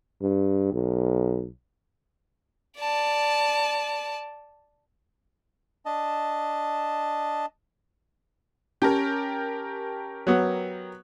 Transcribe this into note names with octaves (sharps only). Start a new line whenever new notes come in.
G2
B1
D5 A5
D4 D#5 A5
C#4 G4 A#4 A5
F#3 B3